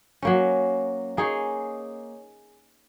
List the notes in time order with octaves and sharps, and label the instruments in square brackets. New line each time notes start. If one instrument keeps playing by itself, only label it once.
[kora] F#3 A#3 C#4
A#3 D#4 G#4 C#5